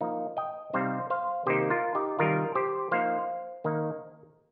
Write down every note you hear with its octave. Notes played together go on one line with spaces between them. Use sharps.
F3 A#3 D#4
D#5 G5
C3 G3 C4 D#4 C5 F5
C5 F5
C3 D#3 A#3 D#4 G4 C5
F4 A#4
D#4 G4
C3 D#3 G3 F4 A#4
G4 C5
F3 A#3 D#4 C5 F5
D#3 A#3 D#4